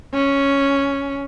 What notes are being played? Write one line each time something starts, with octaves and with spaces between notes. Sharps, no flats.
C#4